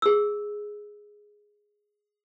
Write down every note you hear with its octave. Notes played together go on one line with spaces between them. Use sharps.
G#4 E6